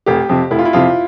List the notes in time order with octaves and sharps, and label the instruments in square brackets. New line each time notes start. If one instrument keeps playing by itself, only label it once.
[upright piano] F1 [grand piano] G4
[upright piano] F2 C3
[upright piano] F1 [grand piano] E4
[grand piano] F4
E4
[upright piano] F2 C3 [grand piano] F4